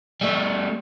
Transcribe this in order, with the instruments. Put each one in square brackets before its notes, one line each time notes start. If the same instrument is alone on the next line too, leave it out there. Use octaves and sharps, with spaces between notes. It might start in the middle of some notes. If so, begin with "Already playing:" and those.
[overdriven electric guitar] G3 A3